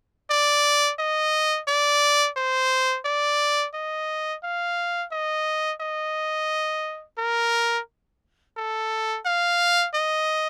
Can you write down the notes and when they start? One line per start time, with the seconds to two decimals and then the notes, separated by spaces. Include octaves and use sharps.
0.30 D5
0.99 D#5
1.68 D5
2.37 C5
3.05 D5
3.74 D#5
4.44 F5
5.12 D#5
5.81 D#5
7.18 A#4
8.57 A4
9.26 F5
9.94 D#5